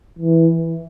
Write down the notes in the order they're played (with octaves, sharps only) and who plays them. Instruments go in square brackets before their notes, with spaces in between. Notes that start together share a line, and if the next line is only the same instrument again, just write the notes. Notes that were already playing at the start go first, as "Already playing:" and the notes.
[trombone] E3